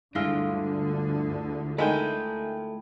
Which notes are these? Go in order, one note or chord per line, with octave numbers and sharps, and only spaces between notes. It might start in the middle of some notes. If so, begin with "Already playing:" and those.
D2 G2 D3 G#3 E4 F4
D#3 G#3 A3 G5 G#5 B5